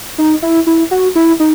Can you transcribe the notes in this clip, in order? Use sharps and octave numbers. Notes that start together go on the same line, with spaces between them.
D#4
E4
E4
F#4
E4
D#4